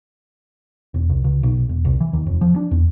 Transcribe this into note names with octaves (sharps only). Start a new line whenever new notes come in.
E1
C2
C#2
B1
E1
C2
E3
D#2
F1
F3
D4
E2